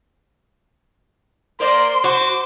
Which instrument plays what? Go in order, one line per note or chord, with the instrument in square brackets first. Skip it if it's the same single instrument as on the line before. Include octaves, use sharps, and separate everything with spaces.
[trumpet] A#3 [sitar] A#4 C5 D5 [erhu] C6
[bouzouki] F#4 [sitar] C5 [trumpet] D6